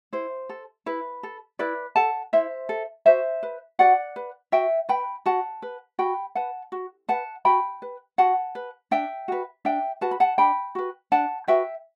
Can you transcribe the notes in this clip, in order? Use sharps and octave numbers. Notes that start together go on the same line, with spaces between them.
E4 C5
A4
E4 B4
A4
E4 B4 D5
A4 F#5 A5
E4 C5 E5
A4
F#4 C5 E5
B4
F#4 D5 F#5
B4
F#4 E5 G5
B4 G5 B5
F#4 F#5 A5
B4
F#4 G5 B5
B4 F#5 A5
F#4
B4 F#5 A5
F#4 G5 B5
B4
F#4 F#5 A5
B4
D4 E5 G5
F#4 B4
D4 E5 G5
F#4 B4 A5
B5
F#5 A5
D4 G5 B5
F#4 B4
D4 F#5 A5
F#4 B4 E5 G5